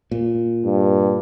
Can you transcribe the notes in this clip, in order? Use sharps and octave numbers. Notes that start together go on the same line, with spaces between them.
A#2
G2